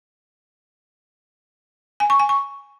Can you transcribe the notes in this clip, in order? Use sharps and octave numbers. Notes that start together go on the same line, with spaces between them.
G#5
C#6
G#5
C#6